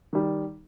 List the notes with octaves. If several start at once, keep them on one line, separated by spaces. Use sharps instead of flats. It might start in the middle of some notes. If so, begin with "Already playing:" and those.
D#3 G3